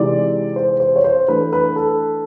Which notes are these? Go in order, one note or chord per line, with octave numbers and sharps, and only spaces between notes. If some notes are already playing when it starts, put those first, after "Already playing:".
Already playing: C3 E3 G#3 C4 D#4 D5
C5
C5
C#5
C5
E3 A3 D4 B4
B4
A4